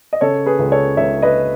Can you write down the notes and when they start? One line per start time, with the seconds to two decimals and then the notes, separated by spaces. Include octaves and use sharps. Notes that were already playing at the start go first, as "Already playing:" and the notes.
0.13 D#5
0.21 C#3 A4 C#5
0.46 G#4 B4
0.59 C#2
0.71 A4 C#5
0.97 C#2 C#5 E5
1.22 B4 D#5